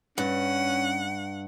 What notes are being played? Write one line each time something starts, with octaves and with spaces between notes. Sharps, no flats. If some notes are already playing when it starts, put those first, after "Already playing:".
G2 C#4 F#5